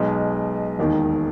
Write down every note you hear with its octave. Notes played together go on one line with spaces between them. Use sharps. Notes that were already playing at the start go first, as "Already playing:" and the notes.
Already playing: B1 B2 G#3
E1 D#2 D#3